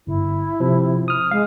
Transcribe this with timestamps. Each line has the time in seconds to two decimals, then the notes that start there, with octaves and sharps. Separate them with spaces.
0.07 G1 E4
0.60 C3 F3
1.08 D#6 F6
1.31 G#3 F5